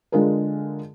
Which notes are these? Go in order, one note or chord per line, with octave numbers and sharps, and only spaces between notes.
D3 G#3 F4 G#4 A#4